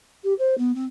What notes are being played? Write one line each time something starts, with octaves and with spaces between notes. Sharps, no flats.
G4
C5
B3
C4